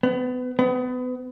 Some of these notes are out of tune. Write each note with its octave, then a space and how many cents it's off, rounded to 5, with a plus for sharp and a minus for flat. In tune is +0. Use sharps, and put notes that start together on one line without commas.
B3 +30
B3 +30